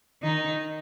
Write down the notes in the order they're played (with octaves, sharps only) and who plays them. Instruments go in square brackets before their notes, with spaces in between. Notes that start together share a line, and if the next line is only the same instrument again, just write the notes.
[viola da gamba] D#3 D#4